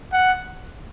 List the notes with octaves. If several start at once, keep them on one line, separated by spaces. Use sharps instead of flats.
F#5